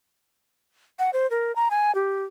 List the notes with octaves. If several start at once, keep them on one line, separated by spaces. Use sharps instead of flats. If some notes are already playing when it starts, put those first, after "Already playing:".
F#5
C5
A#4
A#5
G#5
G4